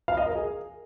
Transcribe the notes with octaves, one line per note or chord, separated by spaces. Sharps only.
F5
D#5
A#4
G#4